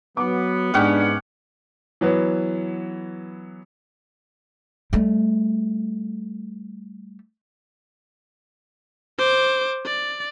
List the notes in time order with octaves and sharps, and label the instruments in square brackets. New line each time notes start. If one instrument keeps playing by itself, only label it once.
[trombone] F#3 [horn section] B3 [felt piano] D6
[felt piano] G#2 [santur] C#4 G4 F#5 [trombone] D4
[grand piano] E3 F#3 B3
[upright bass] G3 A3
[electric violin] C5 D6
D5